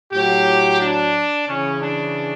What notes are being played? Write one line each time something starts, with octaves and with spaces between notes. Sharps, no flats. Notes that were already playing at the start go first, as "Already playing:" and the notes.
A2 F#3 G4
D4
C#3 E3 C#4
D4